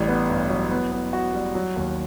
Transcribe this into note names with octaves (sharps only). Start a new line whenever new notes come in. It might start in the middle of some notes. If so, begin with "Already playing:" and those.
Already playing: A1 G3
B3
G2
F#3
B3
B3
F#4
G3
F#3
D#2